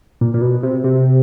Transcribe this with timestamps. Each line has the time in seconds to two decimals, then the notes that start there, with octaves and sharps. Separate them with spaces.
0.21 A#2
0.34 A#2
0.41 B2
0.63 C3
0.84 C3